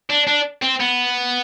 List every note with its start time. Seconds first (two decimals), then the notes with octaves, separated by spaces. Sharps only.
0.10 D4
0.27 D4
0.62 C4
0.80 B3